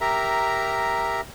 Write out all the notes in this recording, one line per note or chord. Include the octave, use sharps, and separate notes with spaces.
G4 A#4 E5 A#5